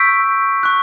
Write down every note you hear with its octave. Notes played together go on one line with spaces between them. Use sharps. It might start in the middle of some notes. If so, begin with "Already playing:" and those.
Already playing: C#6 E6 G6 B6 D7
C#6 F#6